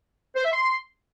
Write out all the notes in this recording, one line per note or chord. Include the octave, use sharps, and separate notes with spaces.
C5
E5
C6